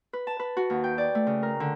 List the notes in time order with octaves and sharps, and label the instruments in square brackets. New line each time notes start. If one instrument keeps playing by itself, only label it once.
[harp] B4
A5
B4
F#4
D#2
G5
D5
A3
C#3
A#4
D3